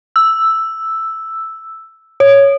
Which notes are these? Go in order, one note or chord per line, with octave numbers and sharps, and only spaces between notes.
E6
C#5